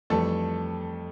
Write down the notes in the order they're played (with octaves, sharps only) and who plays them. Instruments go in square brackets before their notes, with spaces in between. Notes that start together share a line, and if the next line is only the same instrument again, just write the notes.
[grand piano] F2 E3 G3 A3 A4